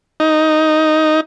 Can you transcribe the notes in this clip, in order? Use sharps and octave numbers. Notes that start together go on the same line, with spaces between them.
D#4